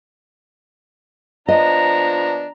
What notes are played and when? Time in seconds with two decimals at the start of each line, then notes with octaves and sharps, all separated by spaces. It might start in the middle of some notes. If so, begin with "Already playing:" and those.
1.48 F3 B3 D4 D#5 A#5